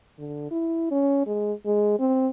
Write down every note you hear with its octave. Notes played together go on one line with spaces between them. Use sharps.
D3
E4
C#4
G#3
G#3
C4